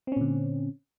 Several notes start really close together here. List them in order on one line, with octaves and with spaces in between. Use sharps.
C4 C#4 A#2 D3